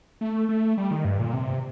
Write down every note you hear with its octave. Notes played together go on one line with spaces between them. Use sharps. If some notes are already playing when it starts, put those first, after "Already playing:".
A3
A3
G3
D#3
G2
A#2
C3